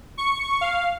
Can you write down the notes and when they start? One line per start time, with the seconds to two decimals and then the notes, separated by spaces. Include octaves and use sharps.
0.18 C#6
0.61 F5